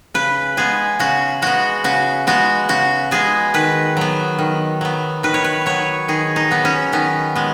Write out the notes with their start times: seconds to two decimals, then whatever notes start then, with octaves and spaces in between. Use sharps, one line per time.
0.14 C#3 B4
0.57 G#3 B3 G#4
0.99 C#3 F#4
1.42 G#3 B3 F#4
1.84 C#3 F#4
2.27 G#3 B3 F#4
2.69 C#3 F#4
3.11 G#3 B3 G#4
3.54 D#3 B4
3.97 F#3 B3
4.39 D#3
4.81 F#3 B3
5.23 D#3 B4
5.34 C#5
5.44 B4
5.66 F#3 B3 C#5
6.08 D#3 G#4
6.36 D#4
6.51 F#3 B3
6.65 C#4
6.93 D#3 B3
7.35 G#3 B3